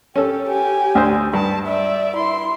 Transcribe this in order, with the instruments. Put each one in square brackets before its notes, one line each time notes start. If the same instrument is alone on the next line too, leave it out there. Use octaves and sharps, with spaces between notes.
[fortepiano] C#4 A4 [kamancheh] G4
[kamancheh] G4 G#5
[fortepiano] D2 C5
[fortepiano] G2 [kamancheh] A5
[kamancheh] D5 E5
E4 C6